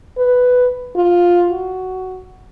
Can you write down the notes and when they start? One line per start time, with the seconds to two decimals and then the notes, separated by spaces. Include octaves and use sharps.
0.18 B4
0.96 F4
1.50 F#4